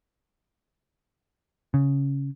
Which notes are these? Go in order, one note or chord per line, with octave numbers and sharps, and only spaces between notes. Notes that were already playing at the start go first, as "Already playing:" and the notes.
C#3